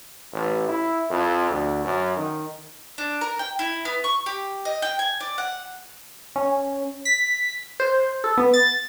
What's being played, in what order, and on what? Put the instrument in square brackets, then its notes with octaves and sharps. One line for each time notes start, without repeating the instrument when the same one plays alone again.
[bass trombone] A1
E4
F2
D2
F#2
D#3
[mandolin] D4
A#4
G5
E4
B3
C#6
G4
D#5
G5
G#5
D5
F#5
[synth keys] C#4
B6
C5
A4
B3
A6